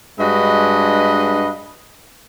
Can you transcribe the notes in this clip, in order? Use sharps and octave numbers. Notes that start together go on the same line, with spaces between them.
G2 G#3 D4 F#4 B4 D#5